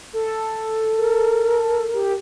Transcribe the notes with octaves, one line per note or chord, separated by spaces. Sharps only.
A4
A#4
G4